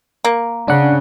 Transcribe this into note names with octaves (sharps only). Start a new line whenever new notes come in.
A#3
C#3 D4 F#5